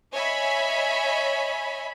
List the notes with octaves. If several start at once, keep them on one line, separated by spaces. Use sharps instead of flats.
C#5 D#5 E5 G#5 B5